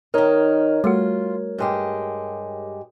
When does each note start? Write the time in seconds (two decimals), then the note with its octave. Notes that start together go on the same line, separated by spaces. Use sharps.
0.14 D#3 D#4 A#4 C#5
0.84 G3 A3 F4 F#4
1.58 G2 G#3 G4